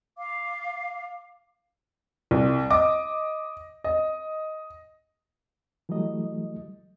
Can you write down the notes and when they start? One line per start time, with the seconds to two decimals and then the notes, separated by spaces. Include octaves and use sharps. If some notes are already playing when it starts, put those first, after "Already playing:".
0.17 F5 D6
2.31 C2
2.70 D#5 D6
3.84 D#5
5.89 E3 F#3 G3 A3 D#5